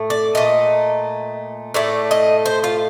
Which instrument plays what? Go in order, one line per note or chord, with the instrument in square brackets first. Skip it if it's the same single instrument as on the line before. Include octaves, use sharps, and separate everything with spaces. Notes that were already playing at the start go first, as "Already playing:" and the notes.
Already playing: [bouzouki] A2 A3
D5
A#2 A3 D#5
A2 A3 D5
D#5
C5
F4